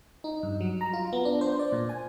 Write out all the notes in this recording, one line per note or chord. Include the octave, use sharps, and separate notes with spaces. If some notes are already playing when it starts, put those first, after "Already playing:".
D#4
G2
F#3
A#5
F4
B3
D4
C5
D5
A#2
G#5